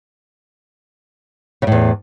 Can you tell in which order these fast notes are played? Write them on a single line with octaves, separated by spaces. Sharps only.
C#3 A2 E2